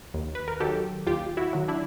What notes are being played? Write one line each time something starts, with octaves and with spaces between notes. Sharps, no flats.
D#2
B4
A#4
D#3 F#3 G4 A4
D#2 F4 G4
E4 F#4
D#3 F#3
D4 E4